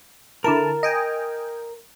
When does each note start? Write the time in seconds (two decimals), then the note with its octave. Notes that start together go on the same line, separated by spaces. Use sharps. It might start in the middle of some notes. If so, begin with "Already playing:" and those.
0.44 D3 E4 A#4 A5
0.83 D#5 G5 G#5